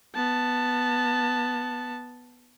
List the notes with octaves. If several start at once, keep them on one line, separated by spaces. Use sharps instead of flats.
B3 A5